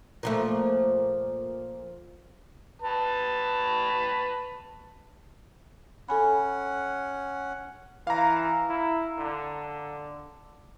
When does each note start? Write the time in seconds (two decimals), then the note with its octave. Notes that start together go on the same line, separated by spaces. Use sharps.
0.23 A#2 F3 A3
2.82 B4 A5
6.09 C#4 A4 F#5 G#5 B5
8.07 E3 F5 A#5
8.69 E4
9.18 D3